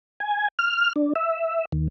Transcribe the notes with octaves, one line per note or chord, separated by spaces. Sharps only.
G#5
F6
D4
E5
D#2